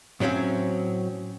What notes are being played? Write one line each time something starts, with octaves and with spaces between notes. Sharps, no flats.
A2 F#3 C4 C#4 F5